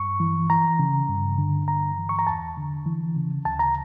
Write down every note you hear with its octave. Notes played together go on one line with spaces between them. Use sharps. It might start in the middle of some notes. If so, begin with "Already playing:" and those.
Already playing: G2 C#6
E3
E3 A#5
C#3
G2
D3
G2 A#5
E3
C#6
A#5
E2 A5
D3
E3
C#3
D2 A5
A#5